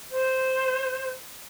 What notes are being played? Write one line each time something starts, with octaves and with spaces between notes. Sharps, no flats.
C5